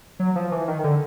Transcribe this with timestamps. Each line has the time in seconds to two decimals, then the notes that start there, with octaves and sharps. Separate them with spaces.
0.19 F#3
0.35 F3
0.52 E3
0.68 D#3
0.84 D3